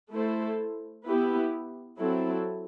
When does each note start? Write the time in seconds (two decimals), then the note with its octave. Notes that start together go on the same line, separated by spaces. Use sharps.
0.11 A3 E4 A4 C5
1.05 B3 E4 G4 B4
1.98 F#3 C4 E4 A4